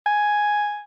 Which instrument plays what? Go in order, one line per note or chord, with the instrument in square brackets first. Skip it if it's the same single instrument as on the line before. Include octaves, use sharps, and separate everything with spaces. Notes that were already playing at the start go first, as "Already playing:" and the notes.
[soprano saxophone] G#5